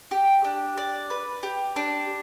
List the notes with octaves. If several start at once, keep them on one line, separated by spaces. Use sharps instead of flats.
G4
D4
D5
B4
G4
D4